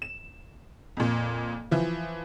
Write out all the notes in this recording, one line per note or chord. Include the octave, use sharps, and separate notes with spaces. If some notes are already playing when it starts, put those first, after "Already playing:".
E7
F2 A#2
E3 F3